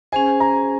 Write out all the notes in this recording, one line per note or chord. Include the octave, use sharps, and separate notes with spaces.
C#4 G#4 C5 G#5
A#5